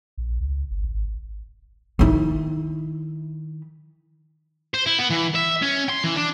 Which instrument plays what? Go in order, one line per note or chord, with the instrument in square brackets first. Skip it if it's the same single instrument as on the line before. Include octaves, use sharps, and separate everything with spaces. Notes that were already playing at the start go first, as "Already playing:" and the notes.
[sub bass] A#1
C#2
G1
G#1
[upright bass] D#3 E4
[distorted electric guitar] C5
E4
B3
E3
E5
C#4
C6
E3
D4